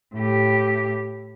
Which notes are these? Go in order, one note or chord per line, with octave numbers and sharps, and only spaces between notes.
A2 G4